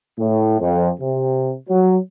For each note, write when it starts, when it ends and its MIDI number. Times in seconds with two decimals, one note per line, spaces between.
0.19 0.59 45
0.60 0.90 41
1.00 1.53 48
1.69 1.98 54